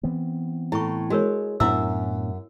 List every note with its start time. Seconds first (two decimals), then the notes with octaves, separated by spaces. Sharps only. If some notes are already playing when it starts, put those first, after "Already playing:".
0.03 E3 B3 C4
0.72 A2 E4 C#6
1.10 G#3 F#4 A#4 C#5
1.60 F#2 A2 B3 D4 E4 F#4 E5 E6